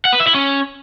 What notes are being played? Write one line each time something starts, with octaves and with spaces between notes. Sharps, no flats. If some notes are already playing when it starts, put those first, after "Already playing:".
F#5
B4
E5
E4
C#4